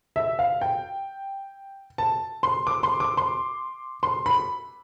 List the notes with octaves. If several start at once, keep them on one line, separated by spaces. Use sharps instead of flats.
E5
F5
G5
A5
C6
D6
C6
D6
C6
C6
B5